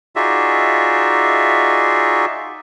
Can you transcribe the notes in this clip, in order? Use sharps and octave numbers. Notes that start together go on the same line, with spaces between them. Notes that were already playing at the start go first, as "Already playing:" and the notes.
D#4 F4 F#4 G#4 D5 E5